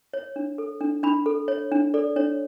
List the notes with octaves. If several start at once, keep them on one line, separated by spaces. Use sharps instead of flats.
C#5
D4
A4
D4
D4 B5
A4
C#5
D4
A4 D5
D4 C#5